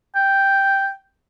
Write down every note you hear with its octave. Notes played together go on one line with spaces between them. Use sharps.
G5